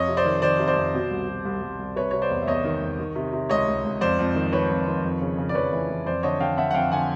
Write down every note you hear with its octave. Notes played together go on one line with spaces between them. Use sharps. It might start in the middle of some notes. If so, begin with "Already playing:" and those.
Already playing: F2 C#5 D#5
C3
C5 D5
D#3
D#3 C5 D5
C3
C5 D5
F2
B2
C2
B2
C2
C2
C2
C3 B4 C#5
C3 C#5
C5 D5
E2
E5
E2 C#5 D#5
D#3
E2
D#3
C3
C3
C#2 C#5 D#5
C#2
C#2
F2 C5 D5
F2
D#3
D#3 B4 C#5
F2
D#3
F2
C#3
C#3
D5
F2 B4 C#5
E3
E3
F2 C5 D5
D3 C#5 D#5
D3 F5 G5
D3 E5 F#5
F#5
F2 F5 G5
D3 F#5 G#5